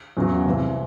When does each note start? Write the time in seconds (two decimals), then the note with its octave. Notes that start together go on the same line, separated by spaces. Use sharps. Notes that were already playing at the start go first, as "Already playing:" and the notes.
0.17 E2 C#3 F#3
0.46 C2 C3 E3 C4